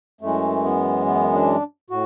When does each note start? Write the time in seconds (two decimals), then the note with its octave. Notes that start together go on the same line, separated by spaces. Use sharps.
0.21 F#2 E3 G#3 A3
0.64 B3
1.06 B3
1.34 D4
1.90 A2 F#4